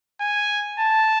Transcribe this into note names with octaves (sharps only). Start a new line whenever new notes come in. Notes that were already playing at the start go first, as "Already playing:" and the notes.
G#5
A5